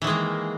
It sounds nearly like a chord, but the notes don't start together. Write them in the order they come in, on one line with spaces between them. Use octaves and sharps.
E3 D#3 G#3 A#3